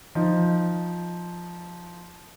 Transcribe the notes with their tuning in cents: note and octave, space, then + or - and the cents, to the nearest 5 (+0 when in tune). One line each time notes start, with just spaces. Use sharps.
F3 +0 D#4 +0